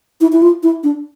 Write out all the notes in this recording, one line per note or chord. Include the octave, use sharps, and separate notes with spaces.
E4
E4
F4
E4
D4